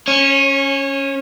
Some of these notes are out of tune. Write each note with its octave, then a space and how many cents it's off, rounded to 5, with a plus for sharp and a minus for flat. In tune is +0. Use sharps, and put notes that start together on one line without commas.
C#4 +0 C#5 -25